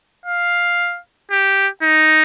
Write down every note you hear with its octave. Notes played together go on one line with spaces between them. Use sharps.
F5
G4
D#4